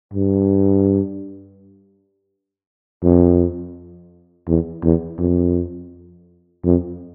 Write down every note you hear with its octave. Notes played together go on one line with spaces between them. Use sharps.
G2
F2
E2
E2
F2
F2